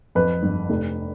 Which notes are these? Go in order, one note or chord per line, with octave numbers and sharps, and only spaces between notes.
F2 B4
G1
F1